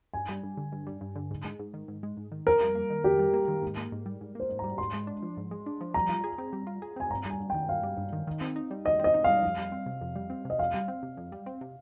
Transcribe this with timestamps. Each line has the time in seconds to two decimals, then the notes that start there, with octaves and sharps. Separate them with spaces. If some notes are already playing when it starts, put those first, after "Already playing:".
0.14 G2 G#5
0.29 G3
0.43 G2
0.57 D3
0.72 G2
0.87 G3
1.01 G2
1.15 D3
1.31 G#2
1.45 G#3
1.59 G#2
1.74 D#3
1.88 G#2
2.03 G#3
2.17 G#2
2.32 D#3
2.46 F2 A#4
2.61 G3
2.75 A#3
2.90 D#3
3.04 F2 G4
3.19 G3
3.34 A#3
3.48 D#3
3.62 G#2
3.77 A#3
3.92 G#2
4.06 G3
4.21 G#2
4.35 A#3 C5
4.49 G#2
4.59 A#5
4.64 G3
4.78 G#2 C6
4.94 G#3
5.07 D4
5.22 F3
5.37 G#2
5.51 G#3
5.66 D4
5.81 F3
5.94 G3 A#5
6.09 F4
6.24 G#4
6.38 C4
6.53 G3
6.67 F4
6.82 G#4
6.96 C4 G#5
7.10 G2 A#5
7.26 G3 G#5
7.40 G2
7.50 G5
7.54 D#3
7.68 G2 F5
7.83 G3
7.97 G2
8.13 D#3
8.27 D#3
8.41 C4
8.56 D#4
8.71 G3
8.85 D#3 D#5
8.99 C4 D#5
9.14 D#4
9.24 G3 F5
9.43 F2
9.58 G3
9.72 C4
9.86 C3
10.01 F2
10.15 G3
10.30 C4
10.45 C3 D#5
10.59 F2 F5
10.74 G3
10.88 C4
11.03 C3
11.17 F2
11.32 G3
11.46 C4
11.61 C3